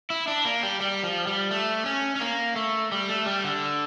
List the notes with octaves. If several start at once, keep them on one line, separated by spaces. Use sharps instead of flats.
E4
D4
A#3
G3
G3
F3
G3
A3
C#4
C#4
A#3
A3
G3
A3
G3
D3